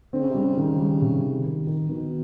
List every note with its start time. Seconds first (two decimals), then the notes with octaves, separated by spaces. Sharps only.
0.13 D3 C4
0.21 C#3
0.29 C3
0.35 C#3 G3
0.57 D#3
0.79 G3
1.02 C3
1.23 D#3
1.46 D#3
1.67 D#3
1.89 B2 D#3